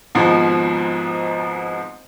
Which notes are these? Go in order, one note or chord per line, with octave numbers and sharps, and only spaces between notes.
G#1 G#2 B2 F3